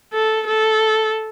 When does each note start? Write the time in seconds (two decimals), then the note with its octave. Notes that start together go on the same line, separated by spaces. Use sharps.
0.13 A4
0.47 A4